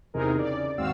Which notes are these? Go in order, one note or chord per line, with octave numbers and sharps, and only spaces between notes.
E2 C3 D#4 G#4 A#4
C#3 D5
D#2 G#2 C4 F#4 F5 E6